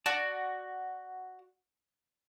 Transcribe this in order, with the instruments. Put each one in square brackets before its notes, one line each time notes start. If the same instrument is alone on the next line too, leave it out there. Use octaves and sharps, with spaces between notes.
[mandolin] F#4 [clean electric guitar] D5 A5